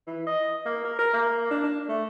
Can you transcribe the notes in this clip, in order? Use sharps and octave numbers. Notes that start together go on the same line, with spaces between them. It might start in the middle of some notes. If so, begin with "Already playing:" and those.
E3
D#5
A#3
A#4
A#4
A#3
D4
D4
A3